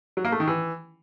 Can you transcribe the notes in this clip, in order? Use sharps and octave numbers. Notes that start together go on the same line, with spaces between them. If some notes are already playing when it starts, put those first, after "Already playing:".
F#3
A#3
A3
D#3
E3